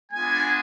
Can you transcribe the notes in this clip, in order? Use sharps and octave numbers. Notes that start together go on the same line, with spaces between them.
G#3 B3 D4 F4 G#5